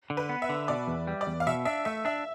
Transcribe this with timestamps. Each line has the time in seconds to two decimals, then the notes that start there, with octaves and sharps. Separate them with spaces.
0.10 D3
0.17 B4
0.29 B3
0.42 E5
0.49 D3
0.68 B2 D5
0.88 E2
1.07 G3
1.21 D5
1.27 E2
1.40 F5
1.47 B2 E5
1.65 D4 E5
1.85 A3 E5
2.05 D4 E5